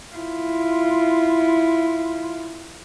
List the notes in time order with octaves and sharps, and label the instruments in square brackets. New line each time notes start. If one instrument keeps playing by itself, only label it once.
[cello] E4 F4